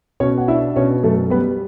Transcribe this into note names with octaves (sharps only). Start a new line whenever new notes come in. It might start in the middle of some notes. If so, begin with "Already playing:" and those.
B2 C#4 C#5
F#5
D4 E4 E5
B2 C#4 C#5
F#2 A3 A4
G3 B3 B4